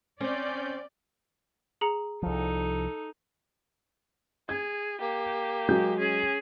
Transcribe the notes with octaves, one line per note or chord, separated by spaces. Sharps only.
C4 C#4 D5 G6
G#4 A#5 C#7
C2 F3 D#4 A4
G#4 G#6
A#3 G4
F#3 G#3 G6
C#4 G#4